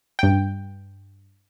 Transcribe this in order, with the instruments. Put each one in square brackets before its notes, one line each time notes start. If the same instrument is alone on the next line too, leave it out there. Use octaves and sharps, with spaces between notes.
[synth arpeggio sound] G2 G5